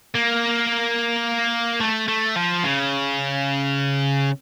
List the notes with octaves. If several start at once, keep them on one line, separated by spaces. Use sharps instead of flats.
A#3
A3
A3
F3
C#3